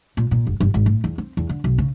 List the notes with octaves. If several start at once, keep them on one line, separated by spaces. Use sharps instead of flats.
A#2
A#2
F#1
G1
G#1
A2
E2
C4
E2
D3
B1
C#3